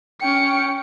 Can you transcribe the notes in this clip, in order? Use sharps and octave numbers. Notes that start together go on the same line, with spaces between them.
C#4 G5 C#7